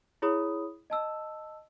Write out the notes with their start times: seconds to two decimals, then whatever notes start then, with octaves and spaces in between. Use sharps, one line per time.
0.22 E4 G#4 C#5 B5 D#6
0.90 D#5 A5 E6